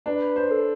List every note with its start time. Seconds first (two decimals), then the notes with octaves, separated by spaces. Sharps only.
0.06 D4 B4
0.36 C5
0.51 A4